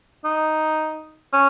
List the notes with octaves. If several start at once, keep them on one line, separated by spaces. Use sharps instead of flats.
D#4
C#4